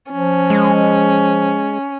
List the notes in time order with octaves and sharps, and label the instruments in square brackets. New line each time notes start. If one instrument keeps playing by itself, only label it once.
[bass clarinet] F3 [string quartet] C#4
[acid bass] G#3